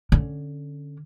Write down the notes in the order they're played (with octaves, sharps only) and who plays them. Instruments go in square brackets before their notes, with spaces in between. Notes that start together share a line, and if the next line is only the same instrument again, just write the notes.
[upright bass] D3 C#4